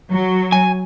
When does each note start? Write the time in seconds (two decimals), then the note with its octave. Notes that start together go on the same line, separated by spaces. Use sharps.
0.10 F#3
0.52 G#5